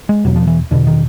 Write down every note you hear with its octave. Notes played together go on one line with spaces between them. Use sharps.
G#3
E2 B2 F#3
F3
E3
E2 B2 D3
D#3